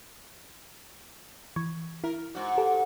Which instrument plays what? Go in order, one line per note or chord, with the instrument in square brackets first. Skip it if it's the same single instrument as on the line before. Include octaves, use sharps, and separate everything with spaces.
[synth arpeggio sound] E3 C#6 G#6
[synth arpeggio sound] E4 [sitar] A#4
[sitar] G#2 F#4
[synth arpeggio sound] G4 A4